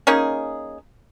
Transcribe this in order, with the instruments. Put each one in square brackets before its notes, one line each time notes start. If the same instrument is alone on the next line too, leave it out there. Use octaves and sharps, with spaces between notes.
[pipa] A#3 C#4 D#4 G#4